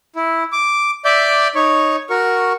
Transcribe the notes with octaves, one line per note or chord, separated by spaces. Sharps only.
E4
D6
D5 E5 D6 G6
D#4 C#5 C#6
F#4 A#4 C#6